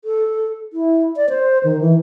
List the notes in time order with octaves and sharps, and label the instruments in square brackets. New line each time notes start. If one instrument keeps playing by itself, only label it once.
[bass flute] A4
E4
D5
C5
D#3
E3